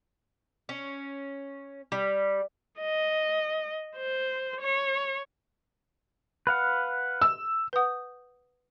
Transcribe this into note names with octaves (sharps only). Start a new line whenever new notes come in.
C#4
G3
D#5
C5
C#5
B4 F5 F#5
E6
B4 F#5 D#6 G6